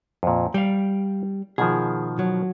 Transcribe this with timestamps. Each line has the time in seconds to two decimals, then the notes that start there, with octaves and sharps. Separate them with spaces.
0.23 F2 A#2
0.54 G3 F5 G5
1.58 B2 D#3 F3 G#4
2.19 F#3